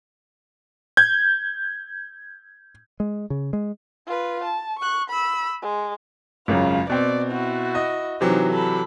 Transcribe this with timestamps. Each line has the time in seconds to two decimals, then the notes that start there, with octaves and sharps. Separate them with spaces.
0.97 G6 G#6
3.00 G#3
3.30 C#3
3.53 G#3
4.07 F4 B4
4.44 A5
4.78 C#6 F#6
5.09 B5 E6
5.62 G#3
6.48 G#1 F#2 C#3 F4
6.90 B2 C4 D5
7.31 E4 F#4
7.75 D#5
8.21 C3 E3 F#3 D#4 C5
8.51 A4 B5